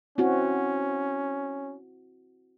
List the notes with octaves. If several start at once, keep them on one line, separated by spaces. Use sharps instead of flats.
C4 C#4 E4 F#4